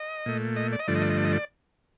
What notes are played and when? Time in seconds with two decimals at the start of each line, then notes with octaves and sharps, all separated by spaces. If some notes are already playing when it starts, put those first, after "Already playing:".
Already playing: D#5
0.26 A#2 A3
0.56 D#5
0.72 D5
0.79 D#5
0.87 G2 D3 F3 A3 D5
0.95 D#5
1.02 D5
1.10 D#5
1.17 D5
1.25 D#5
1.32 D5